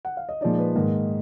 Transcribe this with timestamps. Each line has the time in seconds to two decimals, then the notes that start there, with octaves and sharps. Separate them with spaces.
0.05 F#5
0.17 F5
0.29 D#5
0.41 A#2 F3 G#3 D#4 D5
0.59 B4
0.75 G#2 D#3 A#3